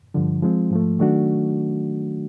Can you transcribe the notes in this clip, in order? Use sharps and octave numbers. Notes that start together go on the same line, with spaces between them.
G2 D3 F3
F3 G#3 C4 F4
G#2 F3 A3
D#3 F#3 A3 D4 F#4